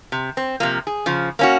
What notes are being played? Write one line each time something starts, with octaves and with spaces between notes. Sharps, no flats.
C3
C4
C3 F3 A#3
G#4
C#3 F3
A#3 C#4 F#4